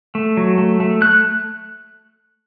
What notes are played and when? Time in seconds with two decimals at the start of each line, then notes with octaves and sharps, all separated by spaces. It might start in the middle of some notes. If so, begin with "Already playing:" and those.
0.15 A3
0.37 F#3
0.58 A3
0.80 A3
1.02 A3 F#6